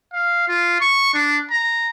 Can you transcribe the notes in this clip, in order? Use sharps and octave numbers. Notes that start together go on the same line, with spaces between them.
F5
F4
C#6
D4
A#5